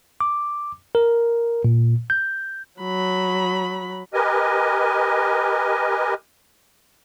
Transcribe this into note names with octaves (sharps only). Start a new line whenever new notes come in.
D6
A#4
A#2
G6
F#3 B5
G4 A#4 B4 D#5 G#5